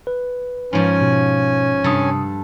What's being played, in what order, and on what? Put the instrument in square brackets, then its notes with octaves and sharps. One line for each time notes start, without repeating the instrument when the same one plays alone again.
[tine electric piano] B4
[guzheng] G#2 F3 [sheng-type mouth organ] C#4 G#5
[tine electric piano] B2
[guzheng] G2 A4 [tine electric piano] C3 D#6